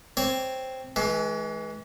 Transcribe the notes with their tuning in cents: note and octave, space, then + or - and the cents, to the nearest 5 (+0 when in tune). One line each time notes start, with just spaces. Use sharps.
C4 +0 C#5 +5
E3 -20 G#3 +35